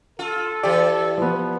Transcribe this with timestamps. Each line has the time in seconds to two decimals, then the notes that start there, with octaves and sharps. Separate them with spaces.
0.19 F4 A4
0.63 E3 G4 D5
1.18 F3 B3